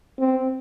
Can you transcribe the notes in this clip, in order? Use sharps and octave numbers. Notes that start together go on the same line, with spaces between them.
C4